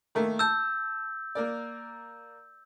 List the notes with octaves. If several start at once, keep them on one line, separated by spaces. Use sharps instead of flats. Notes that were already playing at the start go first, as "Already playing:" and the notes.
D#3 A3 A#3
A5 E6 G6
A#3 A#4 D5